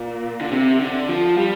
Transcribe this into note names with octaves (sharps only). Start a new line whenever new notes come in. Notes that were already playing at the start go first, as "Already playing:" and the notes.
Already playing: A#2
D3
C3
D3
F3
G3